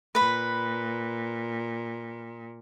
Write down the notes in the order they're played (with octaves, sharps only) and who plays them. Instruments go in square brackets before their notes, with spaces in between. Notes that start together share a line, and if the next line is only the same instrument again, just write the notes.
[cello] A#2 [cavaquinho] B4 B5